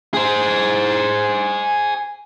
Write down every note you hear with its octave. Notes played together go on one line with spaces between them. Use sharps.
G#4 C5